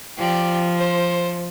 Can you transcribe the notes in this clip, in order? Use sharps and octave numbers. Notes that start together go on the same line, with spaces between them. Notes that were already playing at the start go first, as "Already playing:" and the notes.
F3 G4 D5
C5